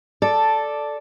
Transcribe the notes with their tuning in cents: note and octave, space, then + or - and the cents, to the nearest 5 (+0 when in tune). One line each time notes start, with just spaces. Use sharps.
A4 +0 D5 +0